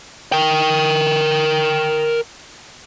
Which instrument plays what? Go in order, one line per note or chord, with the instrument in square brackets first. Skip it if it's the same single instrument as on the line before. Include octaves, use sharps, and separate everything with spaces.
[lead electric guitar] A#4 G5